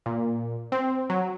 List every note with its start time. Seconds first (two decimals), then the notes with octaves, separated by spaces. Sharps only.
0.06 A#2
0.72 C4
1.10 F#3